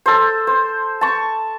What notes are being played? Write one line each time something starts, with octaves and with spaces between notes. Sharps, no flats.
A4 C5
C5
A5 C#6